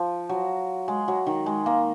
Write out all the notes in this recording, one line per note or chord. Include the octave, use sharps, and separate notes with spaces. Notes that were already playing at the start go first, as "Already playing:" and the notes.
Already playing: F3
F#3
G#3
F#3
D#3
G#3
A#3